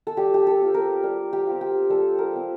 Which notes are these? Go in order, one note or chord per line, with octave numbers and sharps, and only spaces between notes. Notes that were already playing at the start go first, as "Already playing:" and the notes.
A4
G3 G4
G4
A4
C4 F4
A#4
G3 A#4
G4
C4 F4
G4
G3 A4
A#4
C4 F4